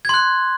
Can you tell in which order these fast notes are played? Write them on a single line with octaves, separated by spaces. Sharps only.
G#6 C6 F#6